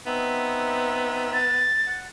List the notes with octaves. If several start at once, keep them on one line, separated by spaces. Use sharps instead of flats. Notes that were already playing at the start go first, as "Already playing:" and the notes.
B3 C4 D#4 E5
A6
F#5